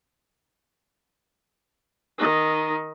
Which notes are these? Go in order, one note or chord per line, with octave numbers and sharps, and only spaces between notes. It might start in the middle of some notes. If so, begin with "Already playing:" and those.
D#3 D#4